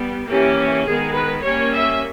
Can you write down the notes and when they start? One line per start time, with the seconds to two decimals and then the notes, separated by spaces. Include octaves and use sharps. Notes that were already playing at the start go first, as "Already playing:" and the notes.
Already playing: G3 B3
0.29 E3 A#3 C#4 G4
0.86 D#3 G#3 B3 G#4
1.15 B4
1.44 G3 A#3 C#4 C#5
1.73 E5